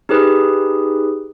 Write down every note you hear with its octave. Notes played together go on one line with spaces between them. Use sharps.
D#4 G4 G#4 B4